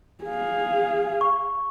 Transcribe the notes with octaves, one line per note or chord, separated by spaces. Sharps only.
G#4 F5
C#6